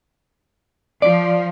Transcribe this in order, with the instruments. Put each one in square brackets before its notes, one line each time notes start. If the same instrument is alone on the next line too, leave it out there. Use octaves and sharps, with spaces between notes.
[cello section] F3 [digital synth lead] D5